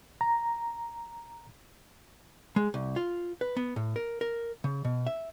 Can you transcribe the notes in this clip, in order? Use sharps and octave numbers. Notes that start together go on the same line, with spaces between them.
A#5
G#3
C2
F4
B4
B3
A2
A#4
A#4
C#3
B2
E5